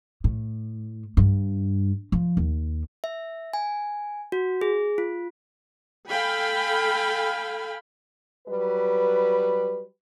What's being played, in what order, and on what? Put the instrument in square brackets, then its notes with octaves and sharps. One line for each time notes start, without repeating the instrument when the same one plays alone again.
[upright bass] A2
G2
F3
D#2
[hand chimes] E5
G#5
F#4
G#4
F4
[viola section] A4 F5 G5 G#5 B5
[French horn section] F#3 G3 B4